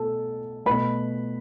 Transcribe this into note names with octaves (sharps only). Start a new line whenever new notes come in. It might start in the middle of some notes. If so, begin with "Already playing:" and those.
Already playing: B2 A3 A4 A5
B2 A3 B4 B5